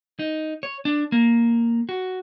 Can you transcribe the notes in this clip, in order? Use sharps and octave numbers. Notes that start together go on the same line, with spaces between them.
D#4
C#5
D4
A#3
F#4